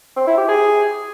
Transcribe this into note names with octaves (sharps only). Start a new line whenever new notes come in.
C4
E4
G4
G#4